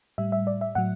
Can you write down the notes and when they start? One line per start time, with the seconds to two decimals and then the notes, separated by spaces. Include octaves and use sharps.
0.18 A2 G3 E5
0.32 E5
0.47 D5
0.61 E5
0.75 A2 F#3 F#5